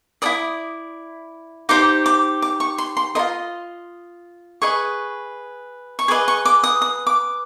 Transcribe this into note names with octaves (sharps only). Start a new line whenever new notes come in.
E4 A4 D5 D#6
D#4 G4 C5 D6
D6
D6
C#6
C6
C6
F4 A#4 D#5 C6
G#4 B4 D#5 C#6
C#6
G#4 B4 D#5 D6
C#6
D6
D#6
D#6
D6